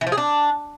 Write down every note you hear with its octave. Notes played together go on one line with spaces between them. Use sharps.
E3
F3
G#4
D4